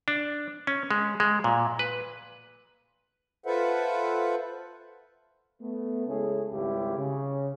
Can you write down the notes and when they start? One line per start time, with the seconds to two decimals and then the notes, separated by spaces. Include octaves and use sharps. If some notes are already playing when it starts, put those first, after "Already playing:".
0.08 D4
0.67 C#4
0.91 G#3
1.20 G#3
1.44 A#2
1.79 B4
3.46 F4 A4 B4 C5 E5 F#5
5.62 A3 B3
6.07 C#3 G#3 C#4 E4 G#4 A4
6.51 G#1 C#2 G3 E4 F4 G4
6.97 C#3